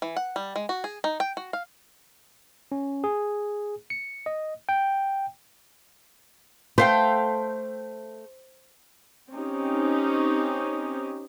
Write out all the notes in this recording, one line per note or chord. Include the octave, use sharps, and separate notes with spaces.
E3
F#5
G3
G#3
F#4
G#4
D#4
G5
F#4
F5
C#4
G#4
C#7
D#5
G5
A3 C5 F5 G5
C4 C#4 D#4 G4